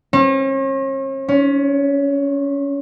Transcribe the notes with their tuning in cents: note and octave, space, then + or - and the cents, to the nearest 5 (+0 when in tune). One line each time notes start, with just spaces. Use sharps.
C#4 -45
C#4 +20